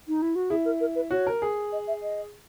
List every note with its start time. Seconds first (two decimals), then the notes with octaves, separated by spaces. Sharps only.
0.08 D#4
0.22 E4
0.36 F#4
0.50 E4 G#4
0.65 A#4
0.81 A#4
0.95 B4
1.11 F#4 C#5
1.27 A#4
1.42 G#4
1.72 D#5
1.88 E5
2.03 D#5